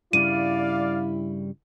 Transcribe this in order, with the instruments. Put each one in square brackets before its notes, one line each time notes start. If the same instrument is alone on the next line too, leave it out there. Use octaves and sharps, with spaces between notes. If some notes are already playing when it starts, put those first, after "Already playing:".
[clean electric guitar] G2 C#3 G3 [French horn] E4 [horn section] D5 F5 [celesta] D#7